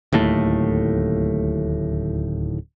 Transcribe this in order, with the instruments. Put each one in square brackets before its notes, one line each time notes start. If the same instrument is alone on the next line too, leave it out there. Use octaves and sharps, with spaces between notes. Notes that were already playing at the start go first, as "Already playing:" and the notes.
[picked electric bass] D1 D#2 A2 A3